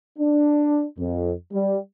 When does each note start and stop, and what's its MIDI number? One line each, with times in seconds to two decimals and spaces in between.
0.19 0.83 62
0.99 1.32 41
1.52 1.77 55